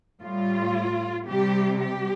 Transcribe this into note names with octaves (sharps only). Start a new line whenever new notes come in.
A2 G3 F4
C3 G3 G4
G4